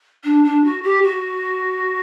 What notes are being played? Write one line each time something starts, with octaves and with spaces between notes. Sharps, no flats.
D4
D4
F#4
G4
F#4